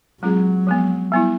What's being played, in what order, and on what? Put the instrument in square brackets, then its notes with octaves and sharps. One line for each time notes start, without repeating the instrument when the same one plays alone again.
[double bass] F#3 [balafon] G#3 C4 F4 G#4
[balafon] F3 G#3 B3
G3 B3 E4